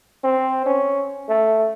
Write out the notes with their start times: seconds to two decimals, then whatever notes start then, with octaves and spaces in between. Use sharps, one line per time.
0.24 C4
0.66 C#4
1.29 A3